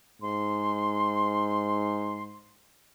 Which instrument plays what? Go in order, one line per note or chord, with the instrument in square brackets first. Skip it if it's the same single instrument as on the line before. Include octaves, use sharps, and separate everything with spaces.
[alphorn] G#2 [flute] C6